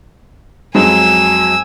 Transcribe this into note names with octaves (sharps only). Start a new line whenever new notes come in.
F2 F#3 G#3 G#5 E6